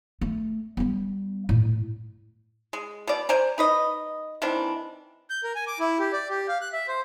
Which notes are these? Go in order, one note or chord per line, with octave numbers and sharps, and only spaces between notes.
A3
G3 B3
A2
G#3
B2 D5
C5 D5 G#5 A#5
D#4 B4 D#5
D#3 E3 C4 D4
G6
A#4
G#5
D6
E4
G4
D5
G4
F5
F#6
E5
C5